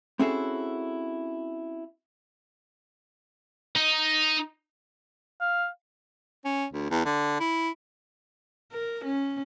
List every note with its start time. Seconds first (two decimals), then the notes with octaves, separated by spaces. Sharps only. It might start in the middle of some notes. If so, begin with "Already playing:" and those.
0.19 C4 C#4 E4 F#4 G#4 A4
3.76 D#4
5.40 F5
6.45 C#4
6.72 D2
6.90 E2
7.05 D3
7.40 E4
8.72 A#4
9.05 C#4